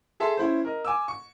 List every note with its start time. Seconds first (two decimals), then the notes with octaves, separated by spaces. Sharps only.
0.20 G#4 A4 E5 A5 C6
0.37 C#4 E4 C5
0.65 A#4 D#5
0.85 G#5 D6 E6
1.08 C#6